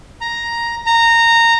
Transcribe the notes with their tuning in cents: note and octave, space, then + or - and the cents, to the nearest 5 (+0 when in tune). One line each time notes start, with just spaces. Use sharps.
A#5 +5
A#5 -15